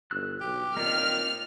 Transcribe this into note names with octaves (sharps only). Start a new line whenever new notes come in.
G1 E6 F#6
B1 G4
A#2 D#3 A#3 C4 D5 F6